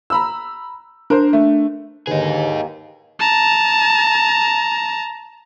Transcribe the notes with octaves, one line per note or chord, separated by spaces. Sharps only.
A#5 B5 E6
D4 A#4 C5
A3
D#2 D3 D#3 D#4 G#4 B4
A5 A#5